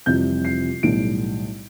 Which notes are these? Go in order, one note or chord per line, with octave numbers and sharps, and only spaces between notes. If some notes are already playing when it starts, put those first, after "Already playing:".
F1 F2 C3 E3 G3 G6
C7
B1 A2 E3 G3 D7